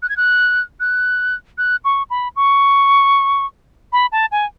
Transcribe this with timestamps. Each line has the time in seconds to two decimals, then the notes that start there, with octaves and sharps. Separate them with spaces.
0.03 F#6
0.09 G#6
0.17 F#6
0.80 F#6
1.58 F#6
1.85 C#6
2.10 B5
2.36 C#6
3.93 B5
4.12 A5
4.32 G#5